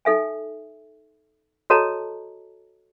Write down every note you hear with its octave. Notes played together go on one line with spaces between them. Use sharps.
D#4 A4 E5 G#5
F#4 A4 C#5 D#5 A5 A#5